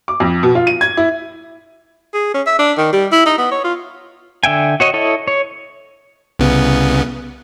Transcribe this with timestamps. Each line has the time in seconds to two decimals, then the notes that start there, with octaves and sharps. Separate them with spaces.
0.08 D6
0.20 F2
0.43 B2
0.55 F4
0.67 D#7
0.81 G#6
0.97 E4
2.14 G#4
2.34 C#4
2.46 E5
2.59 D4
2.78 D#3
2.93 G3
3.12 E4
3.26 D#4
3.38 B3
3.51 C#5
3.64 F4
4.43 D3 E5 G5 G#5
4.80 F#4 C#5 D#5
4.94 E4 A4 C#5 D#5
5.28 C#5
6.39 C2 C#3 B3